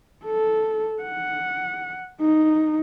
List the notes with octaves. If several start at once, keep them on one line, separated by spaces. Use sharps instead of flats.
A4
F#5
D#4